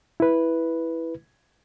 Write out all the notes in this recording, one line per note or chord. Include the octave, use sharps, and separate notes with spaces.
E4 B4